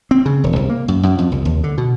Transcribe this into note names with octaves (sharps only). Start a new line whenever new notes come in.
C4
C#3
E1
C2
A#3
F#2
F#2
F2
C2
D#2
D3
B2